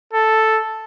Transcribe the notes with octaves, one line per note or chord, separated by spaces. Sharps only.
A4